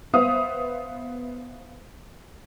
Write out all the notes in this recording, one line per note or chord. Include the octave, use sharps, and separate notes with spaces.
B3 C5 E5 F5 D#6